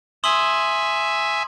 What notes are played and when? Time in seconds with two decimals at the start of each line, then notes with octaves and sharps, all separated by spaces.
0.24 E5 G#5 C6 D#6 F#7